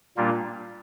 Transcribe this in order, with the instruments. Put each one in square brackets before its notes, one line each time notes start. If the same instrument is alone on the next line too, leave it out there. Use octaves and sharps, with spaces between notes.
[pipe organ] A#2 G3 A#3 D4 F4